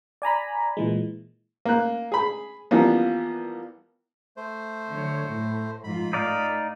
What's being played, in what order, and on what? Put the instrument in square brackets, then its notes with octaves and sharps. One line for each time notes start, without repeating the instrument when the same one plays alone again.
[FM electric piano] D5 G#5 A#5 B5
A#2 E3 G#3
[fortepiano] A#3 F#6
G#4 B5
E3 F3 G3 A#3 B3
[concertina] A3 C5
[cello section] D3 F#3 C#5
A2
[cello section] G#2 F3 F4 [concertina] B5
[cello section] A3 [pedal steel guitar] D#4 D5 F5